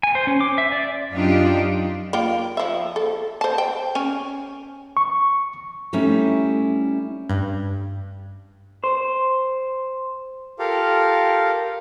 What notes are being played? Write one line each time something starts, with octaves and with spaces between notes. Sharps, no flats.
G#5
C5
C#4
D6
E5
D5
F#2 D4 D#4 F4 G4
A#3 F4 G5
F3 E5
A4
C5 A5
G5
C#4 C#5 G#5
C#6
G3 A3 C#4 D#4 E4
G2
C5
F4 G4 A4 A#4 F5